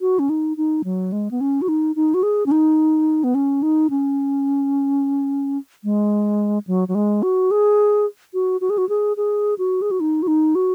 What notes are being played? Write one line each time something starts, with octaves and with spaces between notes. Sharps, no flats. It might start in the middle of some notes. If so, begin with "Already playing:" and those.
F#4
C#4
D#4
D#4
F#3
G#3
B3
C#4
F#4
D#4
D#4
F#4
G#4
C#4
D#4
B3
C#4
D#4
C#4
G#3
F#3
F#3
G#3
F#4
G#4
F#4
F#4
G#4
F#4
G#4
G#4
F#4
G#4
F#4
D#4
F#4
D#4
F#4